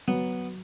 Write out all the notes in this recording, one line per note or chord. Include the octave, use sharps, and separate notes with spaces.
F#3 B3